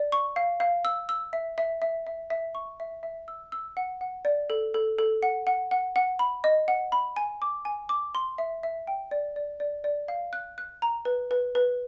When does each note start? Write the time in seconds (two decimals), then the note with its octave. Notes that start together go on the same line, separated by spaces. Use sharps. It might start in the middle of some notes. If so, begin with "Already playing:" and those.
Already playing: D5
0.12 C#6
0.36 F5
0.60 F5
0.85 E6
1.09 E6
1.33 E5
1.58 E5
1.82 E5
2.07 E5
2.30 E5
2.55 C#6
2.80 E5
3.03 E5
3.28 E6
3.52 E6
3.77 F#5
4.01 F#5
4.25 D5
4.50 A4
4.74 A4
4.99 A4
5.23 F#5
5.47 F#5
5.71 F#5
5.96 F#5
6.19 B5
6.44 D#5
6.68 F#5
6.92 B5
7.16 G#5
7.42 D6
7.65 G#5
7.89 D6
8.15 C6
8.38 E5
8.63 E5
8.87 G5
9.11 D5
9.36 D5
9.60 D5
9.84 D5
10.08 F5
10.33 F#6
10.58 F#6
10.82 A#5
11.05 B4
11.31 B4
11.55 B4